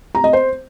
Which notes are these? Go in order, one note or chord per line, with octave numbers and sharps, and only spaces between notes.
A#5
D#5
C5